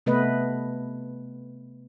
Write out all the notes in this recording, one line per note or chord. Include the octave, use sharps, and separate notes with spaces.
C3 A3 B3 B4 D#5